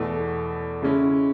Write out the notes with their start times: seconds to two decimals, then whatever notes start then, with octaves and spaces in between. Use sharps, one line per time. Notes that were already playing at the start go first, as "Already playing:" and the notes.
Already playing: E2 B2 A3
0.82 C#3 G#3 C#4 E4